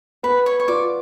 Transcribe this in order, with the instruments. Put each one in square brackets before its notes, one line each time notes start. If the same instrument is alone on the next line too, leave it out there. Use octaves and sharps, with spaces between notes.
[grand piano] B3 [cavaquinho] B4
[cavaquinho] C#5
C#5
[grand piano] F4 [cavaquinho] D5